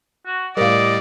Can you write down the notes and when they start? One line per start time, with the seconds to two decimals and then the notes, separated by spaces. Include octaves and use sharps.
0.26 F#4
0.57 A2 G3 A#4 D5 D#5 F5